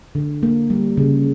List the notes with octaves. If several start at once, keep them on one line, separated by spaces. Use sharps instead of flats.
D3
A#3
G3
C#3